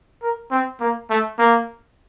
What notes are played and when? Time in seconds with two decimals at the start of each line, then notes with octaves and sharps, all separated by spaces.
0.23 A#4
0.51 C4
0.80 A#3
1.10 A3
1.39 A#3